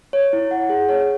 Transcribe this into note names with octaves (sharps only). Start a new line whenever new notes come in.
C#5
E4
F#5
G#4
C#5